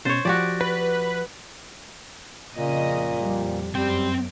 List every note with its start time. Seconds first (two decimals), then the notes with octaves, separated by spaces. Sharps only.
0.05 B2 C#4 C5 C#5 A6
0.25 F3 F#4 G4 D5
0.61 B4
2.55 F2 A#2 C#3 D#5
3.17 F2 G3
3.75 F#2 G3 C4 G5